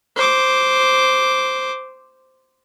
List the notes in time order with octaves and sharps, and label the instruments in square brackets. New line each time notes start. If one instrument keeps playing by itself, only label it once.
[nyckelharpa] C5 D6